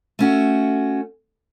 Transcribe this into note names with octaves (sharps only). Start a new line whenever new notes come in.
A3 C#4 F#4